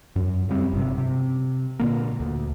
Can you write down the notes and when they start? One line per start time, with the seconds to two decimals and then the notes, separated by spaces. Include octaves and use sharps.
0.16 F#2
0.49 C#3 F#3 G3 C4
0.72 G1 C3
0.98 C3
1.79 A#2 D3 A#3
2.20 D2